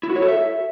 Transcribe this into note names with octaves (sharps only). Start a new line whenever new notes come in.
E4
F#4
C#5
A4
E5